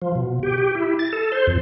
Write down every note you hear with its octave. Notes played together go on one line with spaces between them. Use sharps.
F3
B2
G4
G4
E4
A6
A4
C5
F2